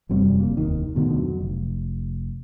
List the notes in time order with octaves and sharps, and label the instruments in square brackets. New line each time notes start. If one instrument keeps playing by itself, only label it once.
[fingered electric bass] E1 F#2 C3 G3
F1 A#3
F1 D#2 D#3
D2 B2 D3 D#3
F2 F#3
F1